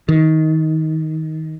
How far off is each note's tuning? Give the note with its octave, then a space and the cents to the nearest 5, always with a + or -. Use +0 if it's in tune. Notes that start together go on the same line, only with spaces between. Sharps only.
D#3 +20